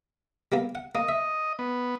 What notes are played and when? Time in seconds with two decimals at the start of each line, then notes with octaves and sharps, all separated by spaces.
0.52 G3 A#3 B3
0.75 F#5
0.95 A#3 D#5
1.09 E5
1.59 B3